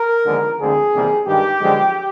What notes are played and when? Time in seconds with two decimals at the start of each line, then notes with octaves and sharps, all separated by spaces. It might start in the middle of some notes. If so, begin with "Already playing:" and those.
Already playing: A#4
0.25 D#2 D3 F3 G#3 B3
0.59 D2 D3 F3 G#3 C4 G#4
0.93 E2 C3 D#3 G3 A#3
1.27 G2 D#3 G#3 G4
1.61 F#2 D3 F3 G#3 B3